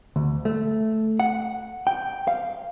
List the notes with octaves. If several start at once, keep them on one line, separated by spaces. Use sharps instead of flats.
D2
A3
F#5
G5
F5